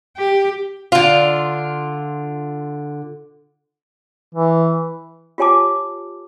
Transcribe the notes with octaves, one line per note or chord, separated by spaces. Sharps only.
G4
D3 F4
E3
F4 G4 C#5 G#5 A5 D6